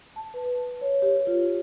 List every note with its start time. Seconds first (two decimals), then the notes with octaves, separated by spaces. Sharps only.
0.16 A5
0.34 B4
0.81 C#5
1.02 G4
1.27 F4